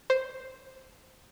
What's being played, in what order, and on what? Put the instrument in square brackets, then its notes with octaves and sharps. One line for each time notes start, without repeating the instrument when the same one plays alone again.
[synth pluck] C5